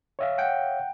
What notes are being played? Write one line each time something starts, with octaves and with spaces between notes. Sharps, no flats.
C#5 E5 F5
F#5 G5